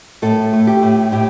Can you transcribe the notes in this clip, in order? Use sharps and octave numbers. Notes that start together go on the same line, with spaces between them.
A2 A4
A3
G4
A2
A2 G4